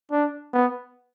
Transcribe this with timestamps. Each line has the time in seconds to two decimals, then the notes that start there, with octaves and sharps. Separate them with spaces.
0.11 D4
0.54 B3